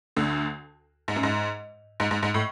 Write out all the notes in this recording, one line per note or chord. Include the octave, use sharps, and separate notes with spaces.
D2 D3
G#2
F#2
G#2
G#2
G#2
G#2
A2